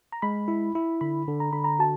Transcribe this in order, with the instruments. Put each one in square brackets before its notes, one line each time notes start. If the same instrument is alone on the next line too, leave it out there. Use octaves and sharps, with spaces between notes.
[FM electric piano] A#5
[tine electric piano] G#3 [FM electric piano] B5
[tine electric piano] E4
E4
[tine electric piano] D3 [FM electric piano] B5
[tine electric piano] D3
[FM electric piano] A#5
[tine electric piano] D3 [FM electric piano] B5
[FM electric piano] A#5
[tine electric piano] F#4 [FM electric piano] A5